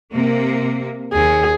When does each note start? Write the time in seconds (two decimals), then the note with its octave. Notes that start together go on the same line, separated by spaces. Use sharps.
0.13 C3 A#3
1.13 D#2 G#4